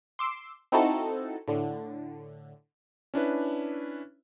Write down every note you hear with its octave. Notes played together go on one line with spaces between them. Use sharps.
C6 D6 E6 C7
C4 D#4 E4 F#4 A4
A2 D3
C#4 D4 E4 B4